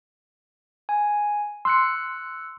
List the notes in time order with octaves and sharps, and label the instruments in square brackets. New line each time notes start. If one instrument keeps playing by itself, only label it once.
[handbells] G#5
[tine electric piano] C6 [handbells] E6 F#6 C#7